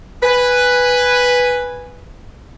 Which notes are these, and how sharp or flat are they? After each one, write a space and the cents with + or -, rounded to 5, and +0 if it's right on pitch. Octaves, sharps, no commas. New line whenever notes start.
B4 +0 G#5 -10